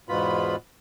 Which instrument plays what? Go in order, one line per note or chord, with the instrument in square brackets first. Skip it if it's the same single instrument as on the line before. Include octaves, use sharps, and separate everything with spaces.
[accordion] E2 G#2 B2 B3 F4 B5